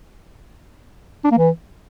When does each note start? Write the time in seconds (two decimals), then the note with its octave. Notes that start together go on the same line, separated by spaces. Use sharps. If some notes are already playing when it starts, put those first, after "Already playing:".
1.24 D4
1.31 A#3
1.38 E3